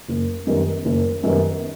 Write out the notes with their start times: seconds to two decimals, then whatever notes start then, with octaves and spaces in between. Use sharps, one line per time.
0.08 F#1
0.47 F#2 D#3 G3 B3
0.85 F#1
1.23 F#2 D#3 G3 B3